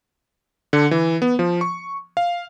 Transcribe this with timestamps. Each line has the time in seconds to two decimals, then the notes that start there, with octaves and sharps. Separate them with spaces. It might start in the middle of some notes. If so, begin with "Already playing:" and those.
0.73 D3
0.91 E3
1.22 B3
1.39 F3
1.61 C#6
2.17 F5